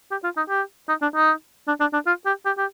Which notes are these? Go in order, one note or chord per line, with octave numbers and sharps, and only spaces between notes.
G4
F4
D#4
G4
D#4
D4
D#4
D4
D4
D4
F4
G4
G4
G4